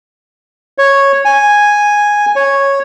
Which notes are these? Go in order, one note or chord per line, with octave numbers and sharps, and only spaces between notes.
C#5
G#5
C#5